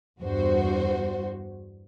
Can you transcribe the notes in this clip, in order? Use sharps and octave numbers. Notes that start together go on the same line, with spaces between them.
E2 G2 F#4 C5